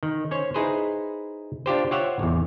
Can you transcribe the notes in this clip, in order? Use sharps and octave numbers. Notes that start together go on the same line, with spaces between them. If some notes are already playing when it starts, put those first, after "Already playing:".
D#3
C#4 C5 C#5
D#4 E4 G#4 B4 C5
D4 F4 G4 C5
F4 G4 C5 C#5 E5 F#5
A1 E2